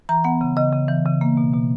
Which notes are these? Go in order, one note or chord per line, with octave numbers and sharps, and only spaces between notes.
E3 A#5
B3 F#5
C#3
C#3 D#5
C#3
E3
C#3
A#3
B2
B2